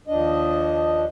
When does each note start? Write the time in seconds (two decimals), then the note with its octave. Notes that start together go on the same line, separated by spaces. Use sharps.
0.07 D#2 F3 D4 D#5